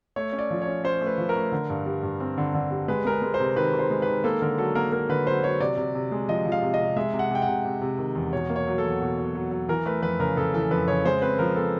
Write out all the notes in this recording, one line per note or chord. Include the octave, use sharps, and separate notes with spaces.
A3 C#5
C#4
D5
F3
C#5
C#4
C#4 C5
A3
B4
F3
A#4
A3
D3
G2
G3
G2
C4
D3
D3
G3
G#3 B4
G#3 A#4
B4
G#3
C5
C3
D#3 B4
D#3
C5
G#3
D#3 B4
A#3 A4
D3 A#4
F#3 A4
A#3 A#4
A#3 A#4
D3 B4
F#3 C5
F#3 C#5
C3 D5
C3
C3
G#3
F3 D#5
F3
F5
C3
D#5
C3
G#3 E5
C3
F#5
C3 G5
F#5
C3
C3
C3
D#3
E2
B2 C#5
A#3
C#5
F#3
A4
E2
B2
F#3
F#3
F#3
E3 A#4
A3 B4
F2 B4
C#3 A#4
C#3 A4
E3 A4
F2 B4
C#3 C#5
G#3 C5
C4 B4
F3 A#4
C4 A4